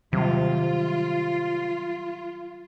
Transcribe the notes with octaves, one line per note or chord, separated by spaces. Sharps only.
C3 D#3 F#3 G3 F4